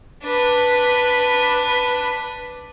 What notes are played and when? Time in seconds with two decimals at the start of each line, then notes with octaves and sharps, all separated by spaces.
0.23 D4 B4